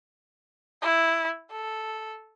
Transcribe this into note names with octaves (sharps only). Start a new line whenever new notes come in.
E4
A4